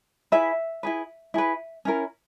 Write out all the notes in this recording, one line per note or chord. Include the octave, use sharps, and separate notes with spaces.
E4 G#4 B4 E5
E4 G#4 B4
E4 G#4 B4
C#4 E4 A#4